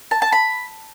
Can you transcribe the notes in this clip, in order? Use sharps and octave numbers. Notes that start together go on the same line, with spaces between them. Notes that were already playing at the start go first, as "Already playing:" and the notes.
A5
A5
B5